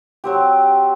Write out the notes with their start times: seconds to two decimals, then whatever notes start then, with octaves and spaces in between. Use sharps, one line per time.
0.24 F#3 C4 G4